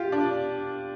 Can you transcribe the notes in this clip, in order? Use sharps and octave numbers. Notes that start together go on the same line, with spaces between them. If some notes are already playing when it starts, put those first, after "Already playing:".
Already playing: F4 G4
D4